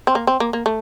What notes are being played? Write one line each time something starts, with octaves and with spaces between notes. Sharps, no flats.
C4
A#3
C4
A#3
A#3
A3